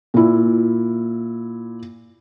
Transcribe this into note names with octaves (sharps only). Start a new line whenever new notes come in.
A#2 E4